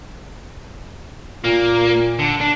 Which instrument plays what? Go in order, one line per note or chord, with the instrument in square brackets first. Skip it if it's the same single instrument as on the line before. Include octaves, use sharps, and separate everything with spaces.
[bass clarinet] A#2 [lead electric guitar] A#3
[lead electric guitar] D3
D4